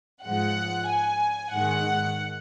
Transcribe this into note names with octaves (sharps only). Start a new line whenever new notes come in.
G#2 F3 G#3 F#5
G#5
G#2 D#3 G#3 F#5